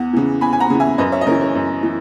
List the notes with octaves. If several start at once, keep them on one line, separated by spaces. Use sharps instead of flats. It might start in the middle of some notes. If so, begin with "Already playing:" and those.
Already playing: E2 F#5
C#3 E3
E2 G#5 B5
G#5
F#5 A#5
C#3 E3
E5 G#5
F#2 B4 D#5
C#5 E5
D#5
C#3 E3 A#4 C#5
A#4 C#5
F#2
E3